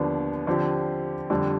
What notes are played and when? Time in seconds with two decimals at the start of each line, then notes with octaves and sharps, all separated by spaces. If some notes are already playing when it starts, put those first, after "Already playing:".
Already playing: D#2 D3 F3 B3 D4
0.47 D3 F3 C4 G4
1.30 F2 D3 G3